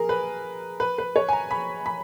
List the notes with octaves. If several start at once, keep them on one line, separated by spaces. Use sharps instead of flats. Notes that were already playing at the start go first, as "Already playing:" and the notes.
Already playing: G#4 A#4
B4
B4
B4
C#5
G#5
A#5
B5
B5